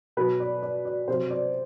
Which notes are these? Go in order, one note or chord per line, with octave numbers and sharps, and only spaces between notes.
B2 F#3 B4
D5
D5
D5
C3 F#3 C5
D5